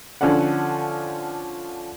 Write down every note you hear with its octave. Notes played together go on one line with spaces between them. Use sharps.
D3 F3 C#4 A4 D5 F#5